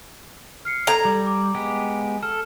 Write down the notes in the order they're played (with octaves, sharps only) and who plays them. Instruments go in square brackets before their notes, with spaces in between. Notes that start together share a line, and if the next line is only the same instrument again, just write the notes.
[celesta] F6 C7 C#7
[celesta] A4 G#6 [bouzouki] A#5
[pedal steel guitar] G3
[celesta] D6
[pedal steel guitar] G#3 B3 G4
[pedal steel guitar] A4 [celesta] F6